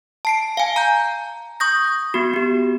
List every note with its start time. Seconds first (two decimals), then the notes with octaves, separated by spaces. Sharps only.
0.25 A5 C7 D7
0.57 F5 G#5
0.76 A#5 G6
1.60 C#6 D#6 G6 A#6
2.14 B3 F#4
2.34 B3 G4